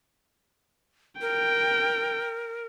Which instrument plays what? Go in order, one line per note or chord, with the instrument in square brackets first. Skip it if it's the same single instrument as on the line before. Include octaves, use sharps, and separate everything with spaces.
[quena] A#4 [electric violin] G5